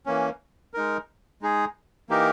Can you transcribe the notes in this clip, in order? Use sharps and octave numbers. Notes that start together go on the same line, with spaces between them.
E3 A#3 C#4
G#3 D#4 A#4
G#3 D#4 G#4
E3 A#3 D#4 G4 A#4